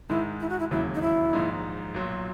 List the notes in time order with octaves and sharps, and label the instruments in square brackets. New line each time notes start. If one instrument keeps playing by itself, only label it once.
[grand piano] G#2 D#3 G#3 [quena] E4
[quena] E4
F#4
E4
[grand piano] E1 D#2 C#3 F#3 [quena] E4
[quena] D#4
E4
[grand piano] A#1 G#2 D#3 A#3 D#4
B1 A#2 F#3